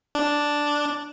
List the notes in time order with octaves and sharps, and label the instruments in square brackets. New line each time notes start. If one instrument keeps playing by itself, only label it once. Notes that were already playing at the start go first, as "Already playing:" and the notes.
[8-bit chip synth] D4